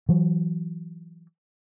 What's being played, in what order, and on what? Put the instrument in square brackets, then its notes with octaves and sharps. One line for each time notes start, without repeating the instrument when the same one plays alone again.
[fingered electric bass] E3 F#3